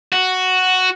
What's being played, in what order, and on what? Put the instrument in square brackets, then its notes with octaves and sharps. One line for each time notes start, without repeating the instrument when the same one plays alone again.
[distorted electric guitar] F#4